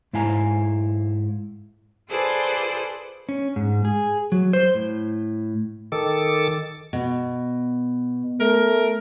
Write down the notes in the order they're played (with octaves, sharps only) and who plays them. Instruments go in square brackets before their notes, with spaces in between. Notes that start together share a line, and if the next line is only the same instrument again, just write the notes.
[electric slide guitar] G#2 E4 F5 G#5 A#5
[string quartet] F4 G#4 A4 B4 C5 D5
[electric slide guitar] C#4
G#2
G#4
F#3
C5
A2
[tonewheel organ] D#3 A4 D6
[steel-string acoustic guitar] B2
[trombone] A3 [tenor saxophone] A#4